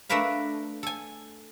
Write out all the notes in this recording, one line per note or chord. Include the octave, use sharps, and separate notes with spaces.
A3 D4 A#4 B4 F5
A4 G#5